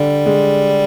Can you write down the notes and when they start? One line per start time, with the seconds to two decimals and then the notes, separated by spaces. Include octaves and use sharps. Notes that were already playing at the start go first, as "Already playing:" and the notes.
Already playing: D3 G3
0.26 G#3